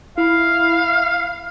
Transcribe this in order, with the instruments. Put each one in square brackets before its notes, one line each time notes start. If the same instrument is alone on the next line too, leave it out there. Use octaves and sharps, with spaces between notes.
[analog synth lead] E4 [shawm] F5